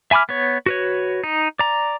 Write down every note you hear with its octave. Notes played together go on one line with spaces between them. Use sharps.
E5 G#5 B5 D6 F6
B3 C#5
F#4 B4 C#5
D#4
D5 A#5